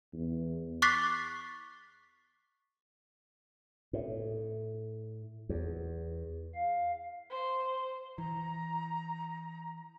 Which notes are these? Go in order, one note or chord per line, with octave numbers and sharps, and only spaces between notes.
E2
C#6 D6 F#6 A6 B6 C7
A2
E2
F5
C5
E3 A#5